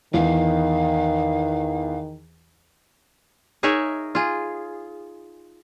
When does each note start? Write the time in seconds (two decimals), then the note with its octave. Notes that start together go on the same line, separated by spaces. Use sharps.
0.14 E2 D#3 F5
3.63 D#4 G#4 A#4 C#5 E5
4.15 F4 G#4